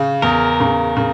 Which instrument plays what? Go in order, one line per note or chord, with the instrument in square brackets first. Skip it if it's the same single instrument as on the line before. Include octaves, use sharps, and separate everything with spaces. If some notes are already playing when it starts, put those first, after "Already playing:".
Already playing: [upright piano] C#3
[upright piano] E2 [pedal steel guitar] A#4
[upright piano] C#3
C#3